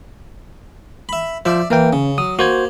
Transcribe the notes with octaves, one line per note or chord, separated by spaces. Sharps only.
E5 B5
F3 F4 C5 D5 E5
E3 A#3 A#4 G5
C#3 C#4
F#3 D#6
A#3 F#4 C5 G#6